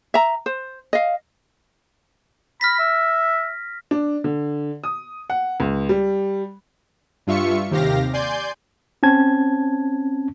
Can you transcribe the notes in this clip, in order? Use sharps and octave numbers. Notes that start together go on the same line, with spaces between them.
E5 A#5
C5
D#5 F5
B5 F6 A#6 B6
E5
D4
D3
D#6
F#5
C#2
G3
G2 F4 E5 C#6 C#7
D#2 C3 G4 F5 A#6
D5 G#5 C6 G6
C4 C#4 A5 G#6